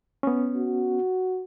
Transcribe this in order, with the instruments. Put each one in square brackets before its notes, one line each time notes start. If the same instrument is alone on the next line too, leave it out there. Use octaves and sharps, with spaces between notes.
[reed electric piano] B3 C#4
[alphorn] F#4